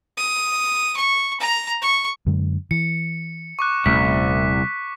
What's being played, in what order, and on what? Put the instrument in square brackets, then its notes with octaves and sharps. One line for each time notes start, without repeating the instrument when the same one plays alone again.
[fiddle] D#6
C#6
A#5
C#6
[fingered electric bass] F#2 D3 G#3
[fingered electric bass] E3 [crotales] C#7
[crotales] C#6 D6 F#6
[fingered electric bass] D#1 A3 C#4 [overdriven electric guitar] C2 [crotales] B6